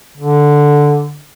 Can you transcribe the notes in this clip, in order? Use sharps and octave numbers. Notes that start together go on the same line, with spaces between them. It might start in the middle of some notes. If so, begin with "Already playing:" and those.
D3